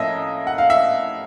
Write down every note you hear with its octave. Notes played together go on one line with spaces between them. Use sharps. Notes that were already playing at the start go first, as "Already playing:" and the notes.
Already playing: A2 F3 A#3 C#4 D#5 E5
F#5
F5
E5